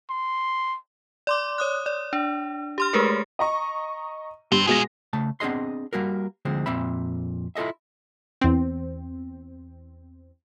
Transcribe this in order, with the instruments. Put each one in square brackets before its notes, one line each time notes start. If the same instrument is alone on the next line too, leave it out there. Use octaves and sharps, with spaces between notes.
[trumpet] C6
[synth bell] D5 C6 D6
C#5 D#6 F#6
D5
D4
G4 C6 F6
G#3 A3 G4 G#4 A#4 B4
[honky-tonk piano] D#5 A#5 C#6
[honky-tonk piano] G2 [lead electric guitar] G4 C5
[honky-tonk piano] B2 G#3 A#6 [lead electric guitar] F4 G#4
[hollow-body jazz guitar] C#3 A3 A5
B3 C4 D4 G#4 D#5 C6
G3 A#3 F#4 A#4
D2 D3 F3 G#3 C4
F2 A#2 C4 E5 B5
E4 F4 A4 D#5 E5
[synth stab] E2 C4